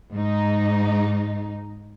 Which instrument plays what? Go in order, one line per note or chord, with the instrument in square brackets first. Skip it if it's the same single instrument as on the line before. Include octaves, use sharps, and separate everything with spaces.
[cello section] G#2 D#4